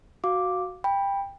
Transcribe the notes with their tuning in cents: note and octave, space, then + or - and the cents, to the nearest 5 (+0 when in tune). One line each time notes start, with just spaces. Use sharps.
F#4 +0 F5 +5 D6 +0
G5 +20 B5 -10